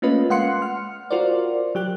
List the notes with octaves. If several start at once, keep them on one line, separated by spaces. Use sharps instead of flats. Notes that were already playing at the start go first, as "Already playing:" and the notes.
A3 A#3 C#4 F4 B4 D#5
G#3 F5 F#5 C6 F#6 C#7
F6
F4 F#4 A#4 C5 D5
F#3 G4 F#6